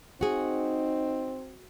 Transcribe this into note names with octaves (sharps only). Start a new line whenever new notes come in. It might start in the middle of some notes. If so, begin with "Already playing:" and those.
C4 D#4 F#4 G#4